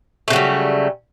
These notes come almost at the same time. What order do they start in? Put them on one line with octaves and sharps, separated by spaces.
A3 C#3 F#3 G3